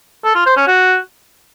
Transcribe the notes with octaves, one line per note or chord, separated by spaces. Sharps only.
A4
F4
C5
C#4
F#4